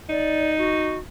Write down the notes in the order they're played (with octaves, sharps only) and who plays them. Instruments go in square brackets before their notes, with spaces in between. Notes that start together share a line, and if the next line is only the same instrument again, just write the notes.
[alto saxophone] D#4 [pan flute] D5
[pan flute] F#4